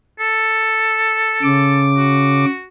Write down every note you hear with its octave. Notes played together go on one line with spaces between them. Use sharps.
A4
C#3 D6
F#4